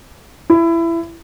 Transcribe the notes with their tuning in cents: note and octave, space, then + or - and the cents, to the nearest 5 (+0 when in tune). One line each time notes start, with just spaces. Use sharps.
E4 +20